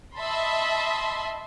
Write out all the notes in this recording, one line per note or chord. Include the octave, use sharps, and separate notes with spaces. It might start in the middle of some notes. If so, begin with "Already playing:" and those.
D#5 E5 A5 B5 C6